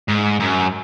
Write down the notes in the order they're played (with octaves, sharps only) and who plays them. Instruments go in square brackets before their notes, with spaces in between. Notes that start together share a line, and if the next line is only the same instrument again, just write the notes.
[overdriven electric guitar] G#2
F#2